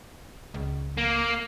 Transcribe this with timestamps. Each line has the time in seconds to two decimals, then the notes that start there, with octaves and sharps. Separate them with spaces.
0.54 C#2
0.97 A#3